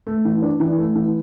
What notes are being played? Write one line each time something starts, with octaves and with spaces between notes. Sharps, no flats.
A3
E3
D4
E3
A3
E3